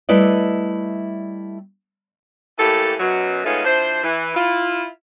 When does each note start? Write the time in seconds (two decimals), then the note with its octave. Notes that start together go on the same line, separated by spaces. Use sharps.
0.09 G3 A3 E4 B4 D5 D#5
2.58 A2 E3 A#3 G4 A4
2.99 F#2 B2 F#3
3.44 G#3 A3 B3 C#4 D#4 F4
3.65 F3 D4 E4 C5
4.03 E3
4.35 E4 F4